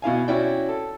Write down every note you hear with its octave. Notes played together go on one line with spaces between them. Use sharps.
B2 E4 F5 G#5
C#4 E4 F#4 D5 G5
A4